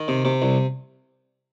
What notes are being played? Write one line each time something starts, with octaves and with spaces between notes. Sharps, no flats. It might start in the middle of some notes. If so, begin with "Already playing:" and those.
Already playing: D#3
C3
C3
C2